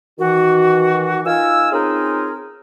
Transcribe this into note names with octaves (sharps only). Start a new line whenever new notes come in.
D#3 E3 F#4
D#4 F4 A#4 G#5 E6
C4 C#4 D#4 F4 G#4 A#4